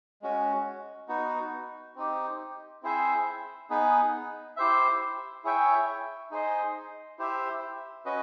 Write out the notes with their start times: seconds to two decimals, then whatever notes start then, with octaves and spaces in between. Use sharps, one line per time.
0.22 G#3 C#4 F#4
1.09 B3 D#4 F#4
1.96 C4 D#4 G4
2.83 C4 E4 G#4 C5 E5
3.70 B3 D#4 G#4 B4
4.57 E4 G4 C5 E5
5.44 E4 G#4 C#5 E5 G5
6.31 D#4 G#4 C5 D#5
7.18 E4 G4 C5 E5
8.05 C#4 F#4 B4 D#5